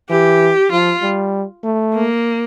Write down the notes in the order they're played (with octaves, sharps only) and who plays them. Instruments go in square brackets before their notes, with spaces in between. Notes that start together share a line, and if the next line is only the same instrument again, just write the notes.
[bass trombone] E3 [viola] G4
[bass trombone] F3 [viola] F4
[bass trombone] G3
A3
[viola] A#3